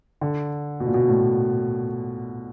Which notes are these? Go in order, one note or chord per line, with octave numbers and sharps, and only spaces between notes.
D3
B2
A#2
B2
A2